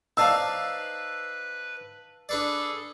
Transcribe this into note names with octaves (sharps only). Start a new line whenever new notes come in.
D#4 B4 C5 D5 F5 A5 E6
D4 G#4 A4 B4 D5